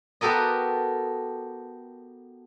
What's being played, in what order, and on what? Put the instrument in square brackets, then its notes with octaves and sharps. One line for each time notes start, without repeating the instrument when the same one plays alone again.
[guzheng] B3 F#4 G4 A4 A#4 D#5